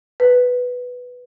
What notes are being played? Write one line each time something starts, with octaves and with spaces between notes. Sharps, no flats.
B4